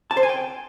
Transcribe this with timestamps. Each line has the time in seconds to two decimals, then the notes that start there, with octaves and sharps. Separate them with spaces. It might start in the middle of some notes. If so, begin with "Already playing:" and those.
0.11 A5
0.17 C5
0.23 G#5
0.29 G5